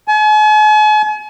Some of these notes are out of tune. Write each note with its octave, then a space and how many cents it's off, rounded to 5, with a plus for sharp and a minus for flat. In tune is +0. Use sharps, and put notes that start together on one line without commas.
G#5 +45